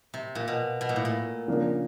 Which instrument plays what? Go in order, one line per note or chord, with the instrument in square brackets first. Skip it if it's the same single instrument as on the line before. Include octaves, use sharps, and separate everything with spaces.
[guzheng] C3
A#2
B2
B2
A#2
A2
A#2
[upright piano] C#3 F3 A#3 D4